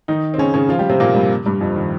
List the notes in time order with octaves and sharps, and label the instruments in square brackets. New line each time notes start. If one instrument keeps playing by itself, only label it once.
[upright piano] D#3 D#4
C4
C#3 C#4
C#3 C#4
F3 F4
G3 G4
C3 C4
A#2 A#3
G2 G3
G2 G3
F2 F3
D#3